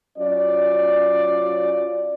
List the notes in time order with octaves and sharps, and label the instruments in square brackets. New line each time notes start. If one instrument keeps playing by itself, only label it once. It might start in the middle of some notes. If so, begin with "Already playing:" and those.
[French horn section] F#3 C#4 F4 D5